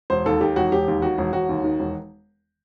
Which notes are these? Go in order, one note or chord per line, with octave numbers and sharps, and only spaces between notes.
E1 C5
D#2 A4
D#3 G4
E1 F#4
E1 G4
D#2
D#3 F#4
E1
E1 F#4
D#2
D#3
E1